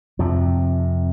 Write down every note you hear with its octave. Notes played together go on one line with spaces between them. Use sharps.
F2 C3 F3